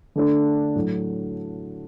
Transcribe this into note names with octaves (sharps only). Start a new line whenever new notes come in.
D3 A3 D4
A2 F#3 A3